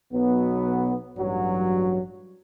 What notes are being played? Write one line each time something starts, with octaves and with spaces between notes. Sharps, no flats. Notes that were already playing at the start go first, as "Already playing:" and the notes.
B1 B2 F#3 B3
A1 G2 F#3